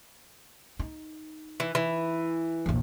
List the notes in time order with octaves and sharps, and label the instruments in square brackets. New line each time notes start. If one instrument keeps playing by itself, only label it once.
[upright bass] D#4
[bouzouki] E3
E3
[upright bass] A#1 E2